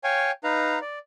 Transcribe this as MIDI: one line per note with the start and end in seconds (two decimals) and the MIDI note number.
0.04 0.31 73
0.04 0.31 77
0.04 0.31 79
0.04 0.31 80
0.04 0.31 85
0.44 0.79 63
0.44 0.79 71
0.44 0.79 77
0.44 0.79 82
0.81 0.99 74